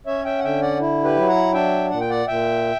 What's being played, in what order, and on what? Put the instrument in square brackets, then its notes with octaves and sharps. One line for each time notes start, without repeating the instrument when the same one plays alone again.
[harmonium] C#4 C#5 E5
E5 G5
F#5
D3 E5 G5
D5 F#5
E4
G4 B4
F#3
F#5 A#5
D4 E5 G5
A#2 F#5
G5
D5 F#5
A#2 E5 G5